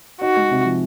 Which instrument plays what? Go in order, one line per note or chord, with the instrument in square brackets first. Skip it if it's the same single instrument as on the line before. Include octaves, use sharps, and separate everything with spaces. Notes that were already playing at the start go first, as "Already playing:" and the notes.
[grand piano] D#4 [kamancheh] F#4
[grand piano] G#3
C3
F3